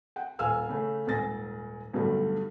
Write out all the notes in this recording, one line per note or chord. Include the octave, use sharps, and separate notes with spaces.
F#5 G5
D#1 F5 G#5 E6 F6
C#3 A3
D#1 G#2 G#5 A6 A#6
B1 G2 D3 G3 A3